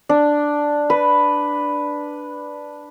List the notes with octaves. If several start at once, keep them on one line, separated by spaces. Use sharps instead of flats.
D4
B4